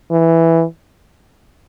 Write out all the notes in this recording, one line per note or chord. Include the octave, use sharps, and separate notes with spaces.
E3